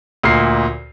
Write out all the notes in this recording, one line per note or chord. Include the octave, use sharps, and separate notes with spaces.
D2 A#2 C7